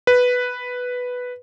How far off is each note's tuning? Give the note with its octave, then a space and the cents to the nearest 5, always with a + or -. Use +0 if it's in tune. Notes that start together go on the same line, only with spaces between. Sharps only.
B4 +0